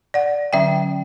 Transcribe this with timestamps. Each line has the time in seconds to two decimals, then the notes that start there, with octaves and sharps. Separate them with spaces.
0.14 D5 F#5
0.53 D3 F#3 C#4 E5 G5